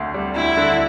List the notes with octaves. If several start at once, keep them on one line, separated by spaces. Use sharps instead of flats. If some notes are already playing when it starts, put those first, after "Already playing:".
Already playing: D2 D3
G3
D2 E4
D3